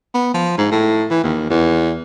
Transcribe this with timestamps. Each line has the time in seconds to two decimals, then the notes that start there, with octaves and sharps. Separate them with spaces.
0.14 B3
0.34 F3
0.58 G#2
0.72 A2
1.10 E3
1.23 D#2
1.50 E2